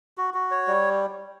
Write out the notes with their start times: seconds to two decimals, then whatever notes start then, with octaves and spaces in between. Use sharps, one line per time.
0.18 F#4
0.34 F#4
0.51 C#5
0.68 G3